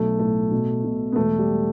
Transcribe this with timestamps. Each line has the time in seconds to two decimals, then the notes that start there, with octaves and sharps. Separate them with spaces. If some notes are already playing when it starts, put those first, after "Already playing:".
Already playing: B1 B2 A3
0.19 A2 A3
0.52 B2
0.84 B2
1.12 B3
1.16 E1 A3
1.39 G3